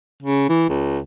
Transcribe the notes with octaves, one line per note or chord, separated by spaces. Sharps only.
C#3
E3
C#2